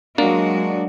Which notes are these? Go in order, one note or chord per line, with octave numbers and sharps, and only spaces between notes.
F#3 G#3 A#3 D4 F#4